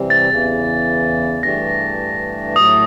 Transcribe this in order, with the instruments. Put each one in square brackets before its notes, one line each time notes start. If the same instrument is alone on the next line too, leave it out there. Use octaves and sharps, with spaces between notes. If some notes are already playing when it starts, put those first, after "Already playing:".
Already playing: [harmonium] C3 E3 G3 C4
[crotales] A6
[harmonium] E2 C#3 E3
[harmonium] G2 E3 A3 D4 G4 [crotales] A#6
[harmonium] A2 F#3 A3 [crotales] D#6